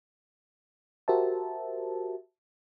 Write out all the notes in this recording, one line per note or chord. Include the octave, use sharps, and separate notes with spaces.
F#4 G4 A#4 C5 E5 A5